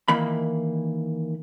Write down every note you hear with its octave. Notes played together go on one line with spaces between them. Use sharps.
D#3 E3 A#3 B5